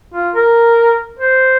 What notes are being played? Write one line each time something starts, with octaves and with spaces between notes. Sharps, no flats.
F4
A#4
C5